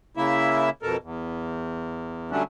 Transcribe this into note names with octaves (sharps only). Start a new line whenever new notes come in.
C#3 A#3 E4 E5
F2 B2 A4 A#4
E2
D3 F#3 G3 A3 C#4 D4